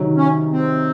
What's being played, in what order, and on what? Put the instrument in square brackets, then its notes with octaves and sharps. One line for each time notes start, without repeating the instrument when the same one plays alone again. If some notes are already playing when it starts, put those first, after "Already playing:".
Already playing: [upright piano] C3 D#3 F#3
[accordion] C#4
C4